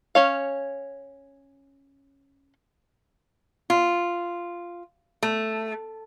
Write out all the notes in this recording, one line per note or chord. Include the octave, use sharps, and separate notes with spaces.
C#4 C#5 F5
F4
A3